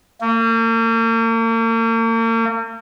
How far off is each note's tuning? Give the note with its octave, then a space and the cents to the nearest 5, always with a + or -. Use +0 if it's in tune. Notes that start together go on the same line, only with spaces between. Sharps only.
A#3 -40